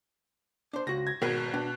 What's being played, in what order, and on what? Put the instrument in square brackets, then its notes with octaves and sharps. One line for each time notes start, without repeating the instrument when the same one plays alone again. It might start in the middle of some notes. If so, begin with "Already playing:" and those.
[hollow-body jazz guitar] D4 C5
[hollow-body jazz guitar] C#2 F#4 [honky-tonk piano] A#6
[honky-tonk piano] G#6 A#6
[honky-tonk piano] G#1 B2 [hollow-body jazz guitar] G#4 A#4 B4
[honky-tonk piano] B2 [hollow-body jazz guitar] D4